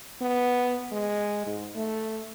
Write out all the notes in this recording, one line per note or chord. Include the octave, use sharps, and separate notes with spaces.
B3
G#3
G#2
A3